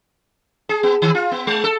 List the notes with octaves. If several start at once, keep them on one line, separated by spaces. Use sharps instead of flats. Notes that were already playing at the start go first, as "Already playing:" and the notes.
G#4
B3
D#3
F4
B3
G#3
A4